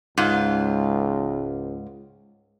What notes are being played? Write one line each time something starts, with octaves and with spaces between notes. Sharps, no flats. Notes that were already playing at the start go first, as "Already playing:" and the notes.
C#2 G#2 F4